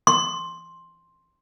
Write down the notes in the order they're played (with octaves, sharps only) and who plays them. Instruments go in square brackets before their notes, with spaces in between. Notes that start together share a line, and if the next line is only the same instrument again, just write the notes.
[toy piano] C6